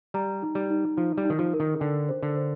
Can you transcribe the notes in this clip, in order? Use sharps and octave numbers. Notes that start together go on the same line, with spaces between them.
G3 A#5
D#4
G3
D#4
F3 D#4
G3
D#4
D#3
F3
A#4
D#3
D3 G5
C5
D3
C5